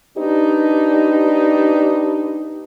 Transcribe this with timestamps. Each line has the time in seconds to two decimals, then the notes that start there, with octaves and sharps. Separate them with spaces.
0.17 A#3 D4 D#4 G4 B4